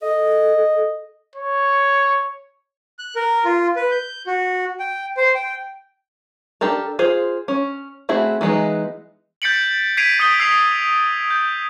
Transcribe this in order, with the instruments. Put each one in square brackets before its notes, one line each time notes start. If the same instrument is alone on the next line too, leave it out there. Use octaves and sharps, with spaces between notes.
[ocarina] A4 [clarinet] D#5
[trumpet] C#5
[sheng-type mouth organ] F#6
A#4
F4
B4
G6
F#4
G5
C5
G5
[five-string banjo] D4 G4 A4 A#4
F4 G#4 C5
C#4
A3 C4 E4 F#4 G#4
E3 F#3 G#3 B3 D#4
[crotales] G6 A6 B6 C#7 D7 F#7
G#6 B6 C7 D7 D#7 F7
D#6 G6 C#7 G7
E6 B6 C7 F7
G6